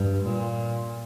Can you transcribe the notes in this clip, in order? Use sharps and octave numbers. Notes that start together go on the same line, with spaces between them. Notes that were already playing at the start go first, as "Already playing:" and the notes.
Already playing: G2
A#2